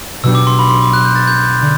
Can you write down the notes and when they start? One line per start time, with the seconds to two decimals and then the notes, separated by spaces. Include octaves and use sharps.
0.23 B2 F#3 B3 D4 G4 E6
0.35 D6
0.47 C6
0.59 B5
0.69 C6
0.82 D6
0.93 F#6
1.05 G6
1.15 A6
1.27 G6
1.62 D3